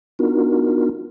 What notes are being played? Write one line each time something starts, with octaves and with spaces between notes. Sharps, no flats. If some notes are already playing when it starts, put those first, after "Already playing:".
B3 D4 D#4 F4 F#4 A#4